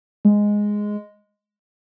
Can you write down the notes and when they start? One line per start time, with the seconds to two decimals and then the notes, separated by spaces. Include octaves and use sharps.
0.25 G#3